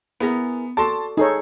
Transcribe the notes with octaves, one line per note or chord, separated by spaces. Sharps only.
B3 E4 G#4 A#4
F#4 A4 D5 A5 C6
D#4 G#4 A4 C#5